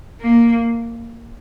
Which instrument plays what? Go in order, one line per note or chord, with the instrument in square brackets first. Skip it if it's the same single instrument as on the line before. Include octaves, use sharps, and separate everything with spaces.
[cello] A#3